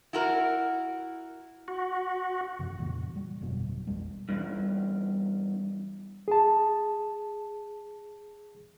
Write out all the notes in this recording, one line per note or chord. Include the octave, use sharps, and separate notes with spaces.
E4 F#4 A#4
F#4
F#2 C3 F3
F2 A#2 C#3 E3
G3
G1 F2 B2 F#3
A#1 E2 G3 G#3
E2 G2
G#4 A5